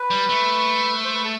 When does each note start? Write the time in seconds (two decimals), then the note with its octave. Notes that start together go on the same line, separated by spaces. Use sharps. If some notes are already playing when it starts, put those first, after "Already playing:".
Already playing: B4
0.10 G3
0.29 A3
1.04 C5
1.14 B4
1.24 A4